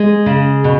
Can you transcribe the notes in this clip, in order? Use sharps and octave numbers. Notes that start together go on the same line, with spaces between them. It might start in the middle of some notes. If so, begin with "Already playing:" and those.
Already playing: G#3
C#3
B2